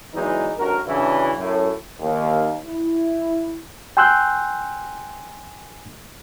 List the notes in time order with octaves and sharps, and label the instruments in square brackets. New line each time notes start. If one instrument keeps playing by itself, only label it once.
[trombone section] E2 E3 F#3 G#3 D#4
A1 G2 F#4 A#4
G2 C#3 E3 D4 E4 F#4
F#2 A2
[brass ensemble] D#2
E4
[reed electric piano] G5 G#5 C6 E6 F#6 G6